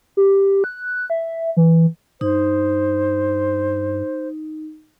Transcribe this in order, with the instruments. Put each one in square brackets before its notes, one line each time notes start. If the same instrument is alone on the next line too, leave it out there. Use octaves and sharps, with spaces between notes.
[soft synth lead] G4
F#6
E5
E3
[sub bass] G2 [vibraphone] D#4 [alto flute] C5